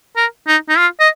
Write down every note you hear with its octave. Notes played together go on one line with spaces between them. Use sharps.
A#4
D#4
D#4
F4
D#5